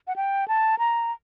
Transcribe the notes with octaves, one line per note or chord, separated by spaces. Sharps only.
F#5
G5
A5
A#5